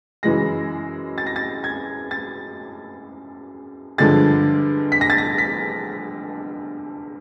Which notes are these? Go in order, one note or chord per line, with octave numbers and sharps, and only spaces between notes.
F#2 C#3 E3 G#3 A#6
A6
A#6
A6
G#6
A6
G2 D3 F3 G#3 A6
B6
A#6
A6
A#6
B6